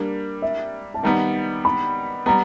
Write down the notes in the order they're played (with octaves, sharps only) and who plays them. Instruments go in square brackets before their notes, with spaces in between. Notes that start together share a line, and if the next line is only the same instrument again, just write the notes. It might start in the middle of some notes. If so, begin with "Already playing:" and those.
Already playing: [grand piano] G3 A#3 D4
[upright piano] E5
A5
[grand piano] D#3 G3 B3 [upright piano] A#5
[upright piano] B5
[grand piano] G3 B3 [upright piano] A#5